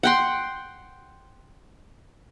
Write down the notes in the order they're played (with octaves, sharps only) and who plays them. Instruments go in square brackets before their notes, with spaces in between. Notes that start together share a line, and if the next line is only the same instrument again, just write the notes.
[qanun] F#5 G5 C6